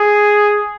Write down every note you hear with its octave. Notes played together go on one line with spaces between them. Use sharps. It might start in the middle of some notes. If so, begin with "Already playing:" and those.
Already playing: G#4